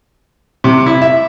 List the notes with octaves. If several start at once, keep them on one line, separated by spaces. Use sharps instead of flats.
C3
E4
E5